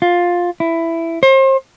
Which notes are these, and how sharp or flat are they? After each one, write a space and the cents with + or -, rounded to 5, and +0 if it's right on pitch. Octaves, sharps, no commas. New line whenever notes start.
F4 +10
E4 +10
C5 +35